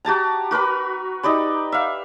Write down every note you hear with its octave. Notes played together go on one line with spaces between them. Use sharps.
F#4 G4 A5 A#5
F#4 A#4 B4 B5
D#4 G4 D5 B5
E5 F5